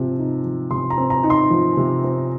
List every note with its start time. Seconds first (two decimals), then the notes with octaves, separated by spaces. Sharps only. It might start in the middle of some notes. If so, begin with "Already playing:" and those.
Already playing: C3 F3 C4
0.18 D#4
0.44 F3
0.70 C3 C6
0.90 A#5
0.97 C4
1.10 A#5
1.24 D#4
1.30 C6
1.50 F3
1.77 C3
2.04 C4